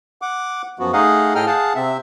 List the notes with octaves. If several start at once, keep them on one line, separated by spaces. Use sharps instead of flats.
F#5 D6
F#2 F3 B3 F#4
A3 D#4 G#4 D#5 F5 F#5
A2 G#4 A4 D#5 G5 F6
G#4 F5 F#5 A5
C3 C4 E5